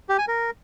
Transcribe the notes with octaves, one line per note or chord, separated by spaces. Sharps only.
G4
G#5
A#4